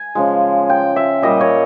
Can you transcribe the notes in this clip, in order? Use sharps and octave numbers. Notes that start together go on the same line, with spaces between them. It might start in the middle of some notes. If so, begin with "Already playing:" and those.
Already playing: G#5
C#3 F3 G#3
G5
E5
A#2 G3 D#5
C#5